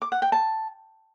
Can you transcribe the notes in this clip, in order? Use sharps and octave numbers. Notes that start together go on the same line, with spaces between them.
D6
F#5
G5
A5